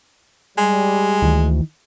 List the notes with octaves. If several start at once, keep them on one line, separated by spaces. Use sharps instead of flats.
G3 G#3
D2 D#3 E3